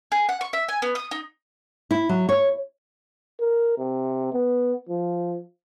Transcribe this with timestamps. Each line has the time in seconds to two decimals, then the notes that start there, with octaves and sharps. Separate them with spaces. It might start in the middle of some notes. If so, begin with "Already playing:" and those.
0.12 G#4
0.29 F#5
0.41 C#6
0.53 E5
0.68 G#5
0.82 B3
0.95 D#6
1.11 D#4
1.91 E4
2.09 F#3
2.29 C#5
3.41 A#4
3.79 C3
4.33 B3
4.89 F3